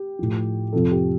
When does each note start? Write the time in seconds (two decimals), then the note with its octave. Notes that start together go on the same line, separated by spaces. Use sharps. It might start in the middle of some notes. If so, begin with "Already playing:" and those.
Already playing: G4
0.19 A2 F3
0.73 F2 C3 F3 A4
0.91 G4